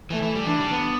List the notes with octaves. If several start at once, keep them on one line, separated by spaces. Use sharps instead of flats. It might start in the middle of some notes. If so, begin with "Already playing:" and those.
E3 A3
E3
G3
E3 D4
G3
B3